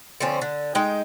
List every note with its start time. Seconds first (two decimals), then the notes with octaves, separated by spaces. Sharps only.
0.20 D3 F3 C4 C#4
0.41 D3
0.75 G#3 D#4 G5